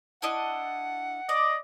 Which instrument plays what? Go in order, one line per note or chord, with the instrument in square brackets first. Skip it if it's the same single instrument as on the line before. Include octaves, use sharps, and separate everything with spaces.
[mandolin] D4 E4 D#5 [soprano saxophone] F#5
[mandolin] D5 [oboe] D#5